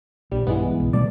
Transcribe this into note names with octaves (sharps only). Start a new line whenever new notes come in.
A#1 G3
B1 G2 E3 G#3 B3
B1
B2 G3 A3 D5